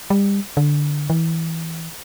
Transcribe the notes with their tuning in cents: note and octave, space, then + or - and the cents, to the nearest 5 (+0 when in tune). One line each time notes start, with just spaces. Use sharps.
G3 +30
D3 +0
E3 -15